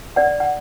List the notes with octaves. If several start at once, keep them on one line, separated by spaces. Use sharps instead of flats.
D5 F#5
F#5